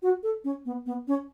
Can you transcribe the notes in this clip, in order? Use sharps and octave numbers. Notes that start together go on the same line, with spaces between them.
F#4
A4
C#4
B3
B3
C#4